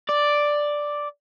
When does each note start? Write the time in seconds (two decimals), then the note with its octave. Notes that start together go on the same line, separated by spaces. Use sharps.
0.09 D5